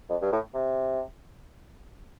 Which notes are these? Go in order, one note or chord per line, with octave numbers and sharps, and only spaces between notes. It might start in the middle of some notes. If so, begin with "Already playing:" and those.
F2
G2
A2
C3